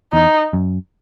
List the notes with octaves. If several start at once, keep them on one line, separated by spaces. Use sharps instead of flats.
E2 D#4
F#2